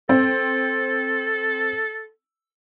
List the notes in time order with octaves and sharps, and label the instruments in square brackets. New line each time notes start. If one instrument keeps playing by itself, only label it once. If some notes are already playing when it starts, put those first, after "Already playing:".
[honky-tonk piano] C4 [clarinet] A4